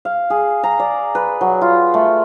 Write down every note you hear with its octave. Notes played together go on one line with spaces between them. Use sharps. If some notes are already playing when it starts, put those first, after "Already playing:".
F5
G#4
A#5
D5
B4
F#3
F4
A3